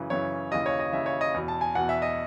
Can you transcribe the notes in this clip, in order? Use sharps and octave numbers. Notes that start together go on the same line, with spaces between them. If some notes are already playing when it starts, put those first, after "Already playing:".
Already playing: F#2 C#3 E3
F#2 C#3 E3 C#5
D#2 C#3 E3 D#5
C#5
D#5
D#2 C#3 E3 E5
C#5
D#5
E2 B2
A5
G#5
E2 B2 F#5
E5
D#5